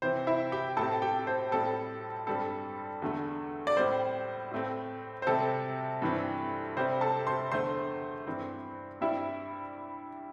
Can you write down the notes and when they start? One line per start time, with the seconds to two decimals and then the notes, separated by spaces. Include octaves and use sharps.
0.02 C3 E3 C4 C5
0.27 E4 E5
0.52 G4 G5
0.77 A2 A3 C4 A4 A5
1.02 G4 G5
1.27 C5
1.52 A2 G3 C4 A4
2.27 G2 G3 C4 A4
3.02 E2 D3 A3
3.67 D5
3.77 A2 G3 C4 C5
4.51 A2 A3 C4
5.22 C5
5.27 C3 G3 C4 A4
6.02 G2 E3 G3 C4
6.77 C3 G3 C4 C5
7.01 A4 A5
7.27 C5 C6
7.52 E2 D3 A3 C5 C6
8.27 G2 E3 C4
9.01 G2 G3 C4 E4 E5